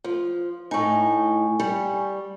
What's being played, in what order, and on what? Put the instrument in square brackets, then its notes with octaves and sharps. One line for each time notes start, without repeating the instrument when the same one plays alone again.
[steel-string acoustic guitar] F3
[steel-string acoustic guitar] A2 D#4 [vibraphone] G#5 C#6
[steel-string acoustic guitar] G3